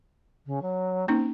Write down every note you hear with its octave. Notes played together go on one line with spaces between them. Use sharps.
C#3
F#3
A#3 C4 C#4 D#4